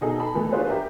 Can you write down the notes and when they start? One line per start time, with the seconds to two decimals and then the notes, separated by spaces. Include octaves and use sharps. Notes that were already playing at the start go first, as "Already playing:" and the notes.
0.01 B2 D#4 G#4 A4
0.20 A5 B5
0.35 E3 G#3 A3
0.53 D4 F4 F#4 G#4 B4 C5
0.68 G4 A#4 E5